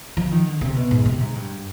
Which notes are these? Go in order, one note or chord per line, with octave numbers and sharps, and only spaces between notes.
F3
D#3
D3
C3
B2
G#2
C3
G#2
G2